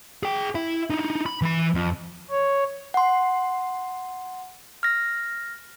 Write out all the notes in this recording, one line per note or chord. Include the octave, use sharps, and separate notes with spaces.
G#4 G5
E4 E5
D#4 E4
B5
E3 B5
F2
C#5
F#5 C6
F6 A#6